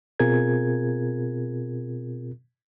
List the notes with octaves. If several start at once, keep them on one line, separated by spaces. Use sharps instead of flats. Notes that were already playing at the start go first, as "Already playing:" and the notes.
B2 C4 F4 G#4 A#4 G#6